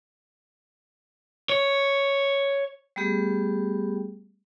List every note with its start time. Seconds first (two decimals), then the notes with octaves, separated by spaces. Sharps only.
1.49 C#5
2.96 G3 A3 B3 G4 G#4